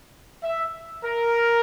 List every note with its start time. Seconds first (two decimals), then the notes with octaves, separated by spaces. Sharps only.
0.43 E5
1.05 A#4